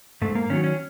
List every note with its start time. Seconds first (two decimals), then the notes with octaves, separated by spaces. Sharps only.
0.22 G#2 A3
0.35 A#3
0.50 D#3 F#3 C#4
0.64 C#4